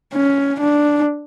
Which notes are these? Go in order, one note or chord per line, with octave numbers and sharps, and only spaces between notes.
C#4
D4